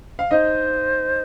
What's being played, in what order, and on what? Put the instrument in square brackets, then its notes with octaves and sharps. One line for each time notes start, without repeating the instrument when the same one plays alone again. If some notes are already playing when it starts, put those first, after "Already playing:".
[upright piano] F5
[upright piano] D#4 D#5 [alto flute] C5